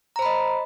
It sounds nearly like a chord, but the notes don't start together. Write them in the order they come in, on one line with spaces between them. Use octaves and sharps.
A#5 C5 B5 D#5